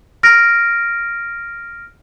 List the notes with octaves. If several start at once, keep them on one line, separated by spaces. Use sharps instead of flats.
F6 A#6 D7